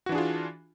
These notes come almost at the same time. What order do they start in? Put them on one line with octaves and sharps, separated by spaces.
F#4 E3 D4 G#4 F4